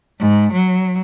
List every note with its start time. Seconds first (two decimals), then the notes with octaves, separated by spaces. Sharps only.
0.19 G#2
0.53 F#3